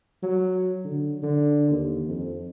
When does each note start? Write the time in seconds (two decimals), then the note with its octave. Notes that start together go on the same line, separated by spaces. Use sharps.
0.23 F#3
0.84 D3
1.23 D3
1.71 D#2
2.08 F2